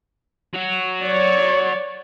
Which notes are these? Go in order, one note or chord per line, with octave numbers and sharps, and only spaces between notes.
F#3 F#4
C#5 D5